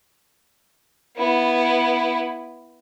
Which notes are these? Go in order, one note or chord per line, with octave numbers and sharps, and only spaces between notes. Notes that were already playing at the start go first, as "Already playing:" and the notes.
B3 E4